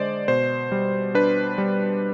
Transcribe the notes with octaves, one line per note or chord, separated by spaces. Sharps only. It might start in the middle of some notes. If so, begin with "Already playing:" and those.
Already playing: D3 G#3 C5 D5 D#5
B2 C5
G3
D4 B4
G3